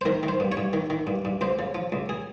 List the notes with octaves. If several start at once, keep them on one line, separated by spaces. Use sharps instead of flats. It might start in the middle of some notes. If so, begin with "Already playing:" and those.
C5
D#3 A#4
D#3
C5
G2
C#5
G2
D#3
D#3
G2
G2
C#2 C5
C#3
F3
C#2
G#4